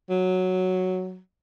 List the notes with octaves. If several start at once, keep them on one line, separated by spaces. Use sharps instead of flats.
F#3